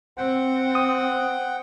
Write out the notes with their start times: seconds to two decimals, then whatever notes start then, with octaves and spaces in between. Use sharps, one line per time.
0.17 C4 F#5 G5
0.75 D#6